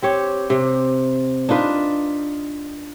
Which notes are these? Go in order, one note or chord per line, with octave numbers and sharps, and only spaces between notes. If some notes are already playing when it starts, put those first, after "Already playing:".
C4 G4 C#5
C3
D4 D#4 F4 B4